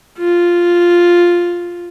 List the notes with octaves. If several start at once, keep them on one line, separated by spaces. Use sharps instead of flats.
F4